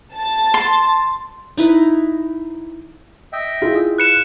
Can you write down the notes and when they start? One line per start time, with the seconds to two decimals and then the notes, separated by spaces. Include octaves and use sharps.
0.13 A5 A6
0.54 C6
1.57 D#4 E4 B4
3.33 D#5 E5 G5
3.62 E4 F4 G#4
3.98 B4 F#6 C#7 E7